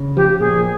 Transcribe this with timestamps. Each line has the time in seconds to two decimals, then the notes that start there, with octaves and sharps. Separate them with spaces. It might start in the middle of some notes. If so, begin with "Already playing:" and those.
Already playing: C#3
0.16 F3 G4
0.39 A#2 G#4